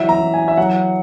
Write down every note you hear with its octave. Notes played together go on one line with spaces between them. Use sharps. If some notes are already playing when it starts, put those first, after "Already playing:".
Already playing: E3 F#3 E5
A#5
E3
G#5
E5
F#3 F#5